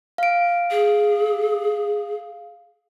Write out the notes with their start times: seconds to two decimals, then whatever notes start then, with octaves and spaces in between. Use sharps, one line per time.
0.18 F5 D7
0.71 G#4